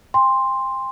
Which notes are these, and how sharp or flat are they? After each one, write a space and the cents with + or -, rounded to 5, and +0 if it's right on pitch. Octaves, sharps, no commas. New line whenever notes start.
G5 +45 C6 +0